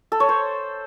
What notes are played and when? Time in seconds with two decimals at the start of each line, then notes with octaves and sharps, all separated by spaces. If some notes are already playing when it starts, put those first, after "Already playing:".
0.12 A4
0.20 C#5
0.29 C5